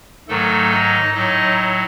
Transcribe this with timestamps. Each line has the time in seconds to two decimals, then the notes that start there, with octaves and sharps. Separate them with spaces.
0.28 G#2 D#3 F#3 A3 A4
0.71 D#4 D#5
1.14 A2 F#3 D#4 D#5